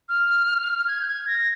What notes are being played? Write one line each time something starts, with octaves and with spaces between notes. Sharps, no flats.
F6
G#6
G6
G#6
A#6